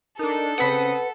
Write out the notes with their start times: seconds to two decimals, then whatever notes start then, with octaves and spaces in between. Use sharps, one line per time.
0.19 D4 D#4 A4 A#4
0.58 C#3 C4 B4 F#5 B5 D#6